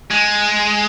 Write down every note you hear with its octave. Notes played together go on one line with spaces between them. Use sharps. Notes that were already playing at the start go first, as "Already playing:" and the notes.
G#3